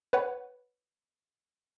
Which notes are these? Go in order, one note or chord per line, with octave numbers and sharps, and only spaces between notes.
B4 C#5 F#5